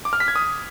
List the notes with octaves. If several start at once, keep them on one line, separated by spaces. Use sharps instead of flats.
D6
F6
B6
G#6
D#6